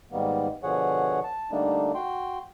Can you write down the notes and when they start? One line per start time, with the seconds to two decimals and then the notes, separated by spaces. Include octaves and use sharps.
0.12 G#2 D#3 G3 A#3 B3
0.63 B2 D3 F3 G#4 C#5 F#5
1.24 A5
1.52 D3 G3 A3 A#3 D4 D#4
1.95 F#4 G5 C6